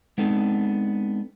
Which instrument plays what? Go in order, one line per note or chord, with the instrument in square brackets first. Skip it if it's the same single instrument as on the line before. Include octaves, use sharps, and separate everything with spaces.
[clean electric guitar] G#3 B3 C4 D4 D#4 A4